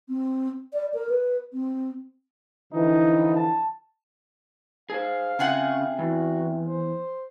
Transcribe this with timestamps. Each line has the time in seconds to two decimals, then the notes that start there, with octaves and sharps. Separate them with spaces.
0.09 C4
0.73 D5
0.94 A#4
1.09 B4
1.53 C4
2.73 D3 E3 F3 D#4
3.36 A5
4.90 G#4 C5 F5
5.39 C#3 C4 F4 G#4 E5 F#5 G5
5.99 E2 F#4
6.67 C5